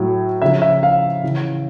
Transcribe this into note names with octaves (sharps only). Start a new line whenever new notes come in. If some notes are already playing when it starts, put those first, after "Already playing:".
Already playing: A2 F#3
C#3 F3 E5
E5
F5
C#3 E3